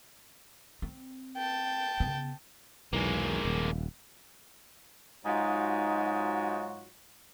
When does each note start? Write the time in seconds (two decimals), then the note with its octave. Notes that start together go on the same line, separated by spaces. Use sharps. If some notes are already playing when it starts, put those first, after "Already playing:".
0.82 C4
1.37 G5 A5
2.00 C#3 B3
2.93 B1 E2 G#3 A#3
3.45 D#1
5.25 G#2 F#3 D#4 F4 F#4